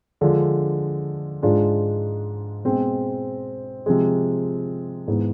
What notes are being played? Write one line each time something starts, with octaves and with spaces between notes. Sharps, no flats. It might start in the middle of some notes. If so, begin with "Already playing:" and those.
D3 F3 G#3 D4 F4
G#2 G#3 D4 F4
B2 G#3 C4
C3 F3 G#3
G#2 G#3 B3 E4